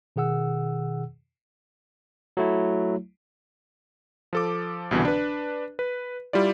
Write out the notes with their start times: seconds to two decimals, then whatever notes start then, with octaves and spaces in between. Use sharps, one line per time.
0.16 B2 D#3 G#4 F#5 E6
2.37 F#3 A3 E4
4.33 F3 A4 D6
4.91 C2 B2 D3 E3
5.05 D4 B4
5.79 B4
6.33 G3 E4 F4 D5